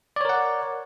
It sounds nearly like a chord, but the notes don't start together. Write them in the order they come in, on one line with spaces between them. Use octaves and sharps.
D5 C#5 A#4 F#5